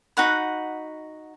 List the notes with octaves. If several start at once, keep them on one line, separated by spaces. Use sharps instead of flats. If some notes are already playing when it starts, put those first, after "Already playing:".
D#4 F#4 F#5 B5